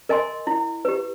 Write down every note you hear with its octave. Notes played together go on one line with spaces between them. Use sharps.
A#4 D#5 G#5 C6
E4
G4 B4